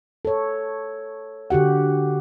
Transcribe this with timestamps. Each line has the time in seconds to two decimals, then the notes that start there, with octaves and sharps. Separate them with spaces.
0.25 A4 C#5
1.50 D3 F#4 G4 F#5